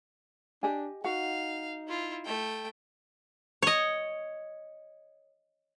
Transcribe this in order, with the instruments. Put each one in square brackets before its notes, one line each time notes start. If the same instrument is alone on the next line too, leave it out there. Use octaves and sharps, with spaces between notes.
[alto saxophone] D4 [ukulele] G4 D#5 G#5
[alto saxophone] D#4 [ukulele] F#4 F#5 [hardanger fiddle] F5
[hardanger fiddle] E4 F4
A3 G5
[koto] C#5 D#5